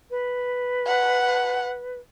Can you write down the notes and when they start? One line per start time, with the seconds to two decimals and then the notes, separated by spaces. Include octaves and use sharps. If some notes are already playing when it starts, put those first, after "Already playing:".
0.10 B4
0.87 F#5